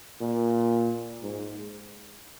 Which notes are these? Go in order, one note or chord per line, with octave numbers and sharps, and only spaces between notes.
A#2
G#2